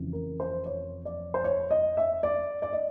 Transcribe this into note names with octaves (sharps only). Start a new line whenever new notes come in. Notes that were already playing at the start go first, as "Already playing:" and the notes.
Already playing: F1 F2 C#3 E3
A#4
C5
C#5
D5
C5
C#5
D#5
E5
D5
D5
D#5